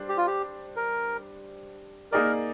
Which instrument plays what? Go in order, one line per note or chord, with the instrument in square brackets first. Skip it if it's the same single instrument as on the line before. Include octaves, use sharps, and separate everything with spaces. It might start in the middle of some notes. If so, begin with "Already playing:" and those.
Already playing: [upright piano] G3 D4 C5
[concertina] G4
F4
G4
A#4
[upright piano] A#3 D#4 G#4 D5 [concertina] A#4